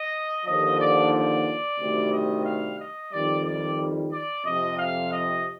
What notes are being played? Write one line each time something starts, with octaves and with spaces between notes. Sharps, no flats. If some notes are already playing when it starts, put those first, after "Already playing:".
Already playing: D#5
D#2 D3 F3 D#5
D5
D5
D2 C3 D#3 G3
D#5
F5
D#5
F2 D#3 G3 D5
D5
D5
F2 C3 F3 D#5
F5
D#5